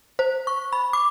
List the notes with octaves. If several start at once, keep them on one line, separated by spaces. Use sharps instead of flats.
C5
C#6
B5
D6